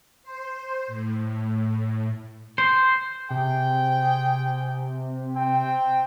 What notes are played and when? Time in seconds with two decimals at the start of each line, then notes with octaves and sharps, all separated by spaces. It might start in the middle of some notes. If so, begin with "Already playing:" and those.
0.23 C5
0.88 A2
2.58 C5
3.30 C3 G#4 G5
5.36 C4 G5